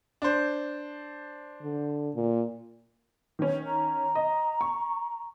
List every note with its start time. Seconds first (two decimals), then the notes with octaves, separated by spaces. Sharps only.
0.22 D4 C5
1.62 D3
2.15 A#2
3.39 D#3 C#4
3.67 A#5
4.15 D#5
4.61 C#6